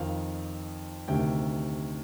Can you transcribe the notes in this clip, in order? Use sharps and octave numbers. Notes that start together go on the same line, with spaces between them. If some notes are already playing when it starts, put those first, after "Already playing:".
Already playing: F2 D#3 F5
D2 C3 D#3 G5